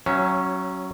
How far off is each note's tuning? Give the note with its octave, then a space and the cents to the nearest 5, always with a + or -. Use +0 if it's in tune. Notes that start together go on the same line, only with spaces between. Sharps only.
F#3 +15 C#4 -5 E5 +30